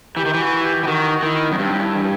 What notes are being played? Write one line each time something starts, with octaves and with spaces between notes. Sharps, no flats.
E3 G4
D#3
E3
F#4
G4
E3 G4
D#3 F#4
D#3 E4
F#2 B3
G2 C4
E4
E3